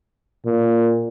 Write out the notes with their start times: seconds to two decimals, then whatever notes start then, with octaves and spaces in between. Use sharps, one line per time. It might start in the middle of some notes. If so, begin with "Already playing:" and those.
0.46 A#2